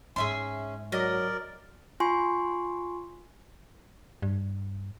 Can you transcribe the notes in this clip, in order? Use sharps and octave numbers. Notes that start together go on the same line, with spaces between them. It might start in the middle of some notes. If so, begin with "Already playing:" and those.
G#2 C#4 G#4 E5 C6
F#3 A#4 D5 D#5
F4 G#5 C6 C#6
G2